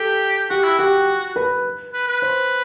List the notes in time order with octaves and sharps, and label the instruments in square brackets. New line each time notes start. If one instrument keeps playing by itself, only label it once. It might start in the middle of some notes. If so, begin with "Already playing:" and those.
Already playing: [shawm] G4 [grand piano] A4
[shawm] F#4 [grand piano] G4
[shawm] E4
[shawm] F#4 [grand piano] G4
[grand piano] B4
[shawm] B4
B4
[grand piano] C5